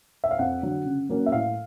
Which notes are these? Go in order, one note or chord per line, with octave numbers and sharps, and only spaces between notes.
E5
F5
F2 F#5
D3 F#3
C#3
F#3 A#3 C#4
E5
A2 F5